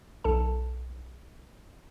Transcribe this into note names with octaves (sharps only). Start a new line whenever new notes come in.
B1 A4 A5